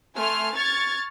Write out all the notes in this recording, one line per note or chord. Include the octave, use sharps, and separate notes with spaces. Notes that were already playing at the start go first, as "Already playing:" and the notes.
A3 G#5 C6 F6
C#6 F6 G#6 A6